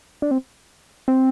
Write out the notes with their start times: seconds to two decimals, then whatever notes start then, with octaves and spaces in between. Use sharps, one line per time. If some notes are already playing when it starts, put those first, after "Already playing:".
0.22 D4
0.31 C4
1.08 C4